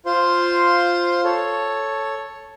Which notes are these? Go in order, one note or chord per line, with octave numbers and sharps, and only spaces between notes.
F4 C5 C6
A4 C#5